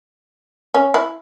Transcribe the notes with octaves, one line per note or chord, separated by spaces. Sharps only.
C#4
E4